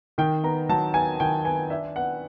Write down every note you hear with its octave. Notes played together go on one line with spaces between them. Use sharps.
D#3 G5
B3 A#5
F#3 A5
B3 G#5
D#3 G5
B3 G#5
D4 E5
B3 F#5